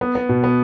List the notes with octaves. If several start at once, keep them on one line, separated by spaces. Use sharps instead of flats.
B3
B3
B2
B3